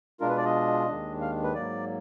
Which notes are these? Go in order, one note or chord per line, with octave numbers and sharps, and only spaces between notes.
B2 G#3 D4 F4 A#4
B4
D5
D#5
D#2 D#3 G#3 D4
F5
B4
G#2 F#3 A#3 D5